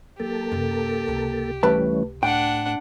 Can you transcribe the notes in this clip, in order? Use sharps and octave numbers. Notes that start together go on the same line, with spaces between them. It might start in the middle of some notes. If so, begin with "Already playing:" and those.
F#3 A#3 D#4 G4 A4
F#2 C3
C#2 C3
E3 G3 A3 C#4 B4 A5
A2 D4 F#5 G5